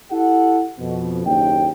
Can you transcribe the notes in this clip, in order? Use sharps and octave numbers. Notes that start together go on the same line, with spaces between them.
E4 G4 A4 F#5
F2 B2
F#1 D#2 C#3 G5